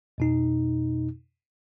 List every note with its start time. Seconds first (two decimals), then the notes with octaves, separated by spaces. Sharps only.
0.18 F2 B2 D#4